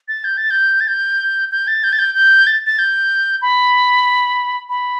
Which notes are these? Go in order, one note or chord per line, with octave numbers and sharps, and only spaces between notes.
A6
G6
A6
G6
A6
G6
G6
A6
G6
A6
G6
G6
A6
A6
G6
B5
B5